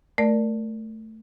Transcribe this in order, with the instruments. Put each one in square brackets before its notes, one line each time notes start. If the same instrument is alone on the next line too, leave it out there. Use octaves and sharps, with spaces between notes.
[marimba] A3 A#4 D5